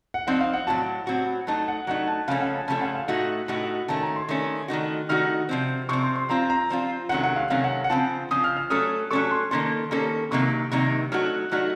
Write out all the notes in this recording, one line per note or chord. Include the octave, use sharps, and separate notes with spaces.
F#5
F3 C4 D#4 F#5
F5
F#5
A2 F#3 C4 F#4 A5
A2 F#3 C4 F#4
F#3 A3 D#4 A5
F#5
F#3 A3 D#4 F#5
A5
C#3 F3 A3 C#4 A4 F5
F#5
A5
C#3 F3 A3 C#4 A4 A5
F#5
F5
A2 A3 D#4 F#4 F#5
A2 A3 D#4 F#4
D#3 A3 C#4 A5
A#5
C6
D#3 A3 C#4
D#3 A3 D#4 F#4
D#3 A3 D#4 F#4 F6
C3 F3 C4
C3 F3 C4 C#6
C6
C6
F3 C4 F4 A#5
A#5
F3 C4 F4
C3 D#3 F#3 A3 C#4 F#5
F#5
F5
C3 D#3 F#3 A3 C#4 F5
F#5
F#5
C#3 F3 C4 F4 A5
C#3 F3 C4 F4 D#6
F6
F6
F#3 A3 C#4 A4 D#6
F#3 A3 C#4 A4 C#6
C6
D#3 A#3 C#4 A4 C6
D#3 A#3 C#4 A4
C3 D#3 F#3 A#3 D#4 C#6
C3 D#3 F#3 A#3 D#4
F#3 A3 D#4 F#4 F6
F#3 A3 D#4 F#4 F6